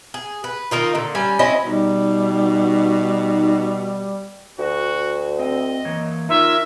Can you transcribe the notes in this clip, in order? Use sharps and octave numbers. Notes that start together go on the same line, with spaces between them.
G#4
B4
D#3 A#3 D#4 F4
A#2 D3
G3 C#4 G#5
C4 C#4 E4 D#5
B2 G3 D#4
D2 F#4
C4 D#5
E3 A#3 C#5
D#4 F4 A#4 C#5 E5